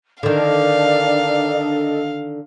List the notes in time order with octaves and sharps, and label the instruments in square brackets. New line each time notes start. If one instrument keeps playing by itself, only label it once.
[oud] D3 D#3 [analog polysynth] D4 A4 D#5 [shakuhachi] D5 [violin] F5